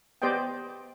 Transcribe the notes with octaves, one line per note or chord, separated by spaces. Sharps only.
B3 G4 C5 D5 D#5 G5